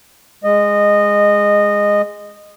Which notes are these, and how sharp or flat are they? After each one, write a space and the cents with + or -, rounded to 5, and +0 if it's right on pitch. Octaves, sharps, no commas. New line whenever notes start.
G#3 -10 D#5 -15